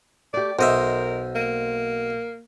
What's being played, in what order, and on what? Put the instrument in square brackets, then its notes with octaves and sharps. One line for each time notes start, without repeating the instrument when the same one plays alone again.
[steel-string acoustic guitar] A3 G4 [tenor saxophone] D5
[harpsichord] B1 D#5 E5 [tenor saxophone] A#4 [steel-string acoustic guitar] C5
[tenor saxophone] A#3